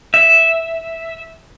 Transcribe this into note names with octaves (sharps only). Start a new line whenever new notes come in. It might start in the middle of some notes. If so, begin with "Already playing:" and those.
E5